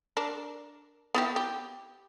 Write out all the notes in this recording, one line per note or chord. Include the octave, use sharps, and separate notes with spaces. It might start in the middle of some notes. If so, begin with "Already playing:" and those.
D4 A#4
B3 E4 G4
G4